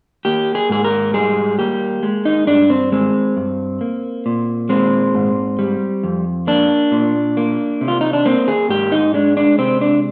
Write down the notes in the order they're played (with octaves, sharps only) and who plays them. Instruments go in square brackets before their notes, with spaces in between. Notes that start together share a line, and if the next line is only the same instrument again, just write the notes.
[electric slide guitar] A#3 G4
G#4
G#2 G#4
A#4
G3 G#4
A#3 G4
G#3
D#4
G2 D4
C4
G#3 C4
G2
A#3
A#2
G#3 C4
G#2
G3
F2
A#3 D4
A#2
A#3
C3
F4
D#4
D4
A#3 C4
G#4
G#2 G4
D#4
G#3 D4
D4
C3 C4
D4